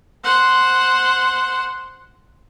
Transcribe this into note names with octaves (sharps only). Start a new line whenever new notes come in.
C5 F#5